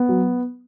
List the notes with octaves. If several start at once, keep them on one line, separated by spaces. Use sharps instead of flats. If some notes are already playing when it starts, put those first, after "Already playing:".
Already playing: B3
F#3